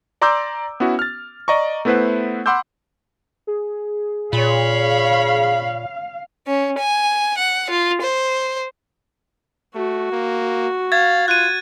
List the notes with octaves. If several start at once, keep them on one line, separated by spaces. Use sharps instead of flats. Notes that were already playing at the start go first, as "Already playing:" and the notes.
D5 A#5 C6 D6 E6 G6
B3 C#4 E4 F#4
F6 A6
D5 D#5 A#5 C#6
A3 B3 E4 B4 C5 F#5
F#5 B5 C6 D6 E6 G6
G#4
A#2 C#5 F5 B5
C#4
G#5
F#5
F4
C5
A3 F#4
A#3
F5 G#6 A6
F4 F#6 D#7